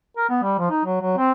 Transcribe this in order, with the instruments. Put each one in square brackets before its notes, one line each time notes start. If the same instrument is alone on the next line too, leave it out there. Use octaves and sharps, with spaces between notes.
[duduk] A#4
B3
G3
F3
D#4
F#3
F#3
C4